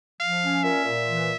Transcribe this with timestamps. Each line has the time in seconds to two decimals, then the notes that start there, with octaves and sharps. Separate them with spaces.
0.20 F3 F5
0.42 C#4
0.64 A#2 E5
0.85 A#2
1.07 E3